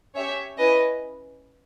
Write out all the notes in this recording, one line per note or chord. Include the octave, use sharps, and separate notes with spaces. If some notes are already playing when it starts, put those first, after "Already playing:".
C#4 G4 C#5 E5
C#4 E4 B4 D#5